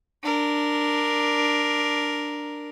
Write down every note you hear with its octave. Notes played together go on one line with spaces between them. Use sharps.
D4 A#4